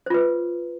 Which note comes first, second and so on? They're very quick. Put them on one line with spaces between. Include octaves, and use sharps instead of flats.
C5 F4 B4